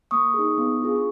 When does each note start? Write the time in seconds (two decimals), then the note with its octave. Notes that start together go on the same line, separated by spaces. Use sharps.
0.11 A#3 C#6 D#6
0.34 G#4
0.39 D#4
0.58 B3
0.80 D4 F4 G#4
0.96 C#6